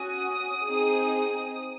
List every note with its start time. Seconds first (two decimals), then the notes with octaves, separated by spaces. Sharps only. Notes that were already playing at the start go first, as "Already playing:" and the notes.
Already playing: C#4 F#4 D#6
0.65 C4 D#4 G#4